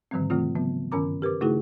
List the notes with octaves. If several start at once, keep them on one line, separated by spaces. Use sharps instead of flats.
G#2 D3 D#3 F3 G3 C4
C3 E3 A3 C4 F4
C#3 F#3 B3
G2 D#3 C#4 A#4 A#5 D6
G4 A#4 B4 D6
C#3 A3 D#4 E4 F#4 G#4